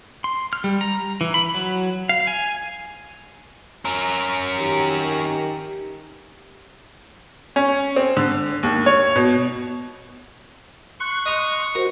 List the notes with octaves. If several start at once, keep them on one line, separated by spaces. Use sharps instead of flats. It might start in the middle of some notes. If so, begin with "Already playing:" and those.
C6
F6
G3
A#5
E3
B5
F#3
F5
G#5
C#4 A#4
D#3 G4
C#4
C4
D3
D#2
C#5
B2
C6 C#6 F#6
D#5 A#5
F#4 A#4 C5